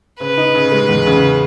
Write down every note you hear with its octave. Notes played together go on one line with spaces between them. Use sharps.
C#3 B4
D#4
C#3
G#3
E2
C#3